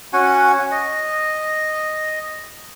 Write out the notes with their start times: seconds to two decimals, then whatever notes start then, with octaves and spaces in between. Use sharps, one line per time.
0.13 C#4 F#4 F#5 G#5
0.72 D#5